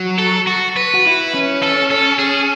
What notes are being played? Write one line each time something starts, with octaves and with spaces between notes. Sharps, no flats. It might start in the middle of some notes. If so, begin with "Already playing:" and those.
Already playing: F#3
A4
F#4
B4
F#4
E4
C#4
A4
A4
G#4